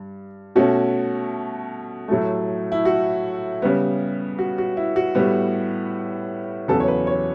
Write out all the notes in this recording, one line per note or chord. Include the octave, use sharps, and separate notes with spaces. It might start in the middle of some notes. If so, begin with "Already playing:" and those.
Already playing: G2
B2 A3 C#4 F#4
A2 F#3 A3
E4
F#4
C#3 G3 B3
F#4
F#4
E4
F#4
A2 G3 B3
E2 C#3 F#3 B3 A4
C#5
B4
C#5